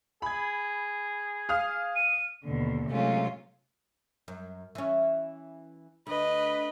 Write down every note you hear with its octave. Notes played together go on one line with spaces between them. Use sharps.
G#4 B5 G#6
F5 D#6 F6
D#7
D#2 B2 D3
C3 F#3 G#3 A3 C#4 F4
F#2
E3 C#4
D2 B4 D#5